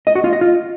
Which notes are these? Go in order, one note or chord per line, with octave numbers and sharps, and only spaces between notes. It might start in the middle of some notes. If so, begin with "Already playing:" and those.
D#5
F#4
F4
D#5
F4